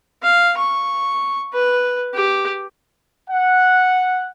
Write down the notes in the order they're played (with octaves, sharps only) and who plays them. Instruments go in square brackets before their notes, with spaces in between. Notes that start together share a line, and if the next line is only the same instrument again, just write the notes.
[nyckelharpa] F5
C#6
B4
G4
[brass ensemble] F#5